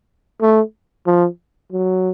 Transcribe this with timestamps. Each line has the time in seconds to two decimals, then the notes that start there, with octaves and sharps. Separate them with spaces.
0.41 A3
1.06 F3
1.72 F#3